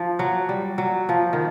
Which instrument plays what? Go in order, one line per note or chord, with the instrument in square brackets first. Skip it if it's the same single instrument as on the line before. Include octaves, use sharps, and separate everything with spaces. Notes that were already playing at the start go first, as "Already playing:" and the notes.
Already playing: [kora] F3
F#3
G3
F#3
F3
D#3